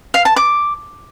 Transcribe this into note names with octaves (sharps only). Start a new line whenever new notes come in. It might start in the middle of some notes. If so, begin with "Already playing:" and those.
F5
A5
D6